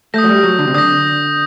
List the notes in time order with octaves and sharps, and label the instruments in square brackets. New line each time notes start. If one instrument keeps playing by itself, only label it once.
[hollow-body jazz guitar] A3 [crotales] D#6 G6 A#6
[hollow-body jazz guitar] F#3
G3
F#3
D3
C3
[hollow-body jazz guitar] D3 [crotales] D#6 G6 A#6